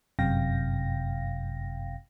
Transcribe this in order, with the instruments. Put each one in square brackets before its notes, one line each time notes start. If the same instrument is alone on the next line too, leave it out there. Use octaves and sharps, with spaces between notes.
[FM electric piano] G1 F#2 C3 F5 G5 A#6